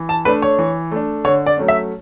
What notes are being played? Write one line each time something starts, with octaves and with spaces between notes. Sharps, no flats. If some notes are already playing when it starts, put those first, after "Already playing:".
Already playing: E3
A5
A3 D4 B4
C#5
E3
A3 D4
D3 C#5
D5
F#3 A3 C#4
E5